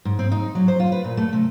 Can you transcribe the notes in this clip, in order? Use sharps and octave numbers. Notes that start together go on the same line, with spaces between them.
G#2
C4
D#4
F#3
C5
F4
B4
A#2
A3
C3